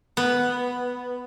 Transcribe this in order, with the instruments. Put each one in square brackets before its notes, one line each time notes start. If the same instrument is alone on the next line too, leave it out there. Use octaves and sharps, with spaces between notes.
[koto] B3